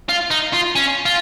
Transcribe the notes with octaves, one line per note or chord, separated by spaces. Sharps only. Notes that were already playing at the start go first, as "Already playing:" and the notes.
F4
D#4
F4
C#4
F4